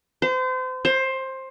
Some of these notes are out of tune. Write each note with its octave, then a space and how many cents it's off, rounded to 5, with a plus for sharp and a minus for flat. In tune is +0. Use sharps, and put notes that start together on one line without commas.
C5 -35
C5 +15